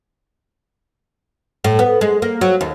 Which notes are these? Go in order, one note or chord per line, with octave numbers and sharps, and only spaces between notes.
A2
B3
G#3
A#3
F#3
D#2